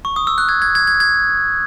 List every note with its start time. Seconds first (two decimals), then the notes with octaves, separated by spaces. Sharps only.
0.05 C#6
0.16 D#6
0.27 E6
0.38 F#6
0.49 G#6
0.62 G#6
0.75 G#6
0.87 G#6
1.00 G#6